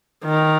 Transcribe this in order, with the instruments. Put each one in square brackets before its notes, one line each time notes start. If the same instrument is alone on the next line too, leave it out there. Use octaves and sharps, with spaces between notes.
[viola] D#3